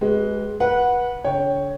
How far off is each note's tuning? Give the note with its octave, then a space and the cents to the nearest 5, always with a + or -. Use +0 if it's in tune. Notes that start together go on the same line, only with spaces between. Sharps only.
G#3 +15 G4 -40 B4 +0
B4 -25 F#5 -10
D3 -40 C#5 +0 G5 +0